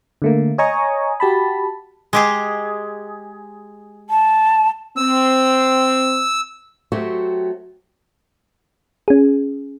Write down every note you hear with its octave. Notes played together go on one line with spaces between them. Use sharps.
D3 A3 A#3
C#5 D#5 G#5 A#5 C#6 D#6
F#4 G4 A5 B5
G#3 G4 G#4
A5
C4 E6
F#3 A3 C4 F#4 G4
C#4 G#4